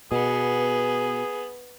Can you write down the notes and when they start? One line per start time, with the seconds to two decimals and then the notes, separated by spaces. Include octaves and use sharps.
0.12 B2 B3 G#4